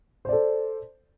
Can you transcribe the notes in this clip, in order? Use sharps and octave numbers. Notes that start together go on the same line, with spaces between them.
A4 C5 D5